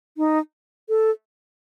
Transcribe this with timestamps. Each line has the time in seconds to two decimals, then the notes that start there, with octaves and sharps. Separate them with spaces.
0.17 D#4
0.89 A4